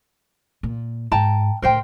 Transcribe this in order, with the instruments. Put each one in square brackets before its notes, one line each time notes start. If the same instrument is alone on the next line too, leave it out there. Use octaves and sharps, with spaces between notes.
[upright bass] A#2
[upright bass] G#2 [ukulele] G5 A5 A#5
[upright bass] A2 D3 [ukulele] A#4 C5 G5